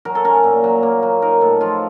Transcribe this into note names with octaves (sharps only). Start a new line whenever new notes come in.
F#3 A#4
A4
C#4 A#4
A#2
F#3
A#3
F#3
D#4 A#4
A2 A4
F3 F4